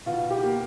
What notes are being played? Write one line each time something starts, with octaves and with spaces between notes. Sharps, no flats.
B2 F4
G4
A#3